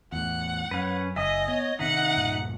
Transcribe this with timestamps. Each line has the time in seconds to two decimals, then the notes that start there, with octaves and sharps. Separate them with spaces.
0.12 E2 A2 F#5
0.71 F#2 C#4 B4
1.16 F#1 D#5 E5 G#5 D#6
1.48 B3 C#5
1.79 C3 D#3 D#4 E5 F#5
2.17 C#2 G2 A#2